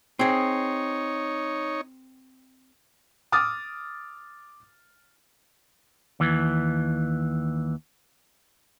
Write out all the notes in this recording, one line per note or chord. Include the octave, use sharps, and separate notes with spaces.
C4 D#4 G#4 C#5
D6 D#6 F6 A6
D#2 E3